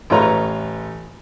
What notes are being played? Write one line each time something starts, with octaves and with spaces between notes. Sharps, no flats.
A1 A3 F4 B4 C#5 A#5